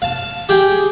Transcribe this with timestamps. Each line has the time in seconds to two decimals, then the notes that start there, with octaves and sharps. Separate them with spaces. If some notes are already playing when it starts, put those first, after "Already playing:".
0.02 F5 A5
0.49 G4 G#4 G5